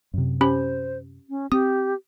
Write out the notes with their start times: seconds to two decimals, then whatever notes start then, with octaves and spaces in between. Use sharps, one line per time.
0.14 F#2 C3
0.41 C#4 G4 C5 B5
1.29 C#4
1.52 C4 G4 D#6